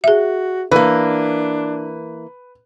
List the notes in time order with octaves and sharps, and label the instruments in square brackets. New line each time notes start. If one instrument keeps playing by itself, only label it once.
[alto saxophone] F#4 [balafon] G#4 E5
[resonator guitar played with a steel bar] E3 A#3 [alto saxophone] D4 [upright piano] B4